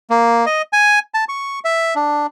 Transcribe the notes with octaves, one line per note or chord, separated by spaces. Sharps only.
A#3
D#5
G#5
A5
C#6
E5
D4